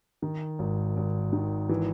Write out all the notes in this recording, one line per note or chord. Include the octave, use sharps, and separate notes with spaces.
D#3
G#1
G#1
D#3
E3